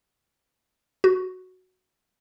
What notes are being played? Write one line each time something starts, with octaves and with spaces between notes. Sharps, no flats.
F#4